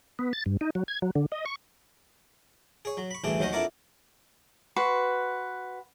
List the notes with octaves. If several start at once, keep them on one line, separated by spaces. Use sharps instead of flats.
B3
A6
G2
D#4
F#3
G#6
F#3
D3
D#5
C#6
G#4 C#5
F#3
B5 C#6
A1 D2 E3 G3 D4 G#4
D#2 F#3 C#4 C5 D#5 F#5
F2 D4 E4 A#4 D5 F#5
F#4 B4 C6